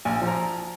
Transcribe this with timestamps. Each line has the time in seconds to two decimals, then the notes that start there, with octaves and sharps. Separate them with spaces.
0.05 A#1 G#5
0.16 G#5
0.22 F3
0.27 A#5